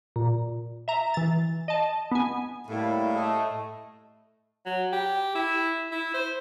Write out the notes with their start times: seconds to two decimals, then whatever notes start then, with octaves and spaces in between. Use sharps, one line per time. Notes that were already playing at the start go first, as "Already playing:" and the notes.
0.16 A#2
0.88 E5 A#5
1.14 E3 A6
1.68 D#5 A5
2.12 B3 G#5
2.68 A2 G3 A#3 E4
3.15 A3 D#5
4.66 F#3
4.93 G4
5.35 E4
5.92 E4
6.14 C5